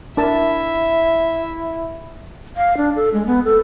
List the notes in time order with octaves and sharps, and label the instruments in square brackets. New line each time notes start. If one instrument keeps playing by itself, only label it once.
[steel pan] D4 A#4 A5 [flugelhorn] E4 [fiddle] E5
[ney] F5
D4
A4
G#3
B3
A4